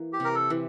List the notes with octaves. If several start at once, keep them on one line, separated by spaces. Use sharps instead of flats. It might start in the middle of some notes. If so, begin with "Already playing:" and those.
Already playing: E3 A#3
G4
C3 A#4
A4
E3